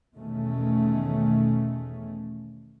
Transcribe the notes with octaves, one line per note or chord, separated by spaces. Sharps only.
E2 B2 D#3 A3 C#4